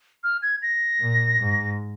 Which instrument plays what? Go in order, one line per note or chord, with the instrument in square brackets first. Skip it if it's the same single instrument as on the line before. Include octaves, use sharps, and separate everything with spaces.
[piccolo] F6
G#6
A#6
[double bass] A#2
G#2